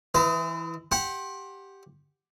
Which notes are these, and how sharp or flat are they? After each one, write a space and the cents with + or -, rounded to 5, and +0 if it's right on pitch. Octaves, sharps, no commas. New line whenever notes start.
E3 +0 C5 -45 D#5 +25
G4 +0 F#5 +0 C6 +25